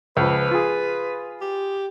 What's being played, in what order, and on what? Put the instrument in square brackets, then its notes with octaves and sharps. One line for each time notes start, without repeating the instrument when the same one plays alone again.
[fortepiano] C#2 F3 [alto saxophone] B4
[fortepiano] F4 G#4
[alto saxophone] G4